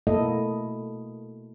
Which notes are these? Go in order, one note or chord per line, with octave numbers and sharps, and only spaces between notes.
B2 A3 A#3 E4 A4 D#5